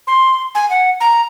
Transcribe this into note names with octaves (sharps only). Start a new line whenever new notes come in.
C6
G#5
F#5
A#5